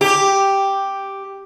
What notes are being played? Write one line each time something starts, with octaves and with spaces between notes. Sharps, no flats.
G4